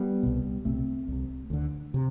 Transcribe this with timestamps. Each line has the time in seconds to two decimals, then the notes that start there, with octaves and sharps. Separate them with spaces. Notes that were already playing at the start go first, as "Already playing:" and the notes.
Already playing: G3 B3
0.23 C2 B2
0.65 C2 B2 A3 C4
1.08 C2 C3
1.50 D2 D3
1.94 C3